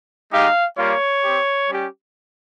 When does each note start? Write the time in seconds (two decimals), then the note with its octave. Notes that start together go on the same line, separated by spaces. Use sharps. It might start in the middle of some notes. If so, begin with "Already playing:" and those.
0.32 G#3 D#4 G4 F5
0.78 G3 A#3 F4 C#5
1.23 C4 G4
1.70 G3 C#4 G4